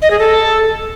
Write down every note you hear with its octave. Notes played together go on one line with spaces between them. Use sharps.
D#5
G#4
A4